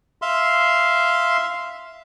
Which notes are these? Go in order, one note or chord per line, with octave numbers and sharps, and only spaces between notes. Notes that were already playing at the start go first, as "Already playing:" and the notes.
E5 F5 C6